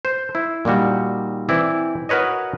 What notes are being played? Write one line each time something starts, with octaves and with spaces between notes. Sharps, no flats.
C5
E4
A#2 D#3 G3 F#4
E3 C4 E4 D5
F#4 A#4 B4 C#5 D#5